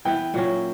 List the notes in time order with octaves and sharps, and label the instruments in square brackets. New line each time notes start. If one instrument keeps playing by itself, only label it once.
[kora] E3 B3 E4 [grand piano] G5
[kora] A#2 F#3 C#4